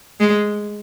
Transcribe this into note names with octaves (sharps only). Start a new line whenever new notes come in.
G#3